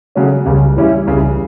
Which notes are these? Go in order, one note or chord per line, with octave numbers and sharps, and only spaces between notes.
C#3 F#3 A3 C#4
C#2 C#3 G3
A2 E3 G3 C#4 E4
C#2 C#3 E3 G3